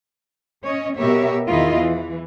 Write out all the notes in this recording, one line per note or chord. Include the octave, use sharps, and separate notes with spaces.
C#4 C#5 D#5
B2 B3 G4 A#4 C#5 E5
E2 D#3 E4 F4 D#5
E3